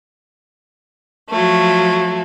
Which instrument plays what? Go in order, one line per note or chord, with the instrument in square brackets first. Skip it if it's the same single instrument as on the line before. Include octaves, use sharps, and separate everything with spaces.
[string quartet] F3 F#3 A3